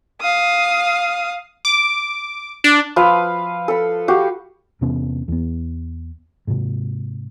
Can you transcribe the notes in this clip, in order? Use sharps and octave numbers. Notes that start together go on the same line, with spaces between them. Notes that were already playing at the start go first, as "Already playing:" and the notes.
F5 D#6
D6
D4
F3 B4 F5 E6
A4 B5
F#4 G4 F5
E2 C3 B3 C#4
E2 B3
G#2 C3